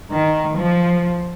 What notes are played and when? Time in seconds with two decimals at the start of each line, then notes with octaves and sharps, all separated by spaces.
0.11 D#3
0.55 F3